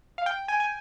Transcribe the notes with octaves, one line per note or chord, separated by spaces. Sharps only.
F5
G5
G#5
G#5